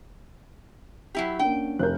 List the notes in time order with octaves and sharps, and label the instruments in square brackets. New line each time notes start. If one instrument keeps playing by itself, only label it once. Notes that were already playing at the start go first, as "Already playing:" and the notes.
[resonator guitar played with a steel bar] F#3 E4 G4
[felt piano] A#3 C#4 D4 [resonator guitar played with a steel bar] G5
[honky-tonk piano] F1 A#4 [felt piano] F#6 G6